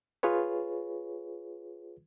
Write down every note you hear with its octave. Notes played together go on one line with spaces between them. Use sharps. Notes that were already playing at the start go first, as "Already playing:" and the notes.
F4 G#4 B4 C#5